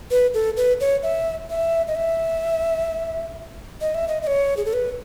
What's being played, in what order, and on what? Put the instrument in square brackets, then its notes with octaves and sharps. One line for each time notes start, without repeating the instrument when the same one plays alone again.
[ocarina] B4
A4
B4
C#5
E5
E5
D#5
E5
D#5
E5
D#5
D#5
C#5
G#4
A4
B4